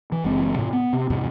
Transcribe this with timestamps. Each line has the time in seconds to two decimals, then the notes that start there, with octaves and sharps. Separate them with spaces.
0.12 E3
0.24 F#1 E3 G#3 C4
0.55 A2 C3
0.73 B3
0.93 C3
1.10 E2 G#2 C3